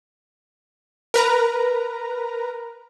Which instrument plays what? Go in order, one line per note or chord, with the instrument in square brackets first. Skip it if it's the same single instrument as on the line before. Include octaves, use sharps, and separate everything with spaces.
[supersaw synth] A#4 B4 A#5